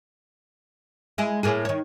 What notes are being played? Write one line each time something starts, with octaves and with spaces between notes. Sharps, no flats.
G#3 E4 G#4
A2 A#3 G#4
D#3 C#5